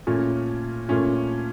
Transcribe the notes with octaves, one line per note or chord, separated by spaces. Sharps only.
A#2 A3 C#4 F4
A#2 A3 C#4 F4